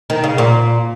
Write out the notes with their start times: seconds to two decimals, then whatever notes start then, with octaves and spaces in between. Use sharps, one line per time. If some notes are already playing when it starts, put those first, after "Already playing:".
0.10 D#3
0.24 C#3
0.38 A#2